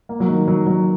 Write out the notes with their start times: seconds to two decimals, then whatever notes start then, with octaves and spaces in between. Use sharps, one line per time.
0.09 A#3
0.20 F#3
0.28 D#3
0.48 F#3
0.67 F#3